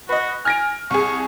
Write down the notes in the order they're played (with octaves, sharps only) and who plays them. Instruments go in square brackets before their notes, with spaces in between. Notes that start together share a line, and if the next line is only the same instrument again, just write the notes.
[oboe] F#4 [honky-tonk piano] B4 D#5
[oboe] G#5 [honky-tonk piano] F6 A#6 D7
[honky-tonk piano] C2 G#4 [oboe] C#6